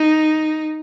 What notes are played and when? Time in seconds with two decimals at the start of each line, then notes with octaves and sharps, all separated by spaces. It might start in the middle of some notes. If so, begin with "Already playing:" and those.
Already playing: D#4